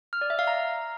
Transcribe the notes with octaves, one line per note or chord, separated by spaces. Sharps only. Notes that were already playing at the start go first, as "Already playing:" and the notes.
F6
D5
E5
F5
A#5